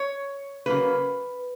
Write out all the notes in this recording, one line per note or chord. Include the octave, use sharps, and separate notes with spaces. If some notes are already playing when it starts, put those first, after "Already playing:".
Already playing: C#5
C#3 F#3 A#3 B4